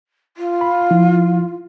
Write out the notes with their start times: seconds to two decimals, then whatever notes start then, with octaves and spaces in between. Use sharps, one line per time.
0.37 F4
0.61 B5
0.90 F3 E4